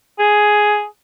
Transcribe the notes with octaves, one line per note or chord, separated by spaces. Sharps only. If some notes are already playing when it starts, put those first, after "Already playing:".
G#4